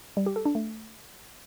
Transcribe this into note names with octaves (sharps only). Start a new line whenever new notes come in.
G3
G4
A4
D4
A3